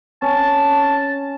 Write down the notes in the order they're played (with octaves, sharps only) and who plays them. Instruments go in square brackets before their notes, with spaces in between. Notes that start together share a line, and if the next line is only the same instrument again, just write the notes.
[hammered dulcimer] C#4 [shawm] A5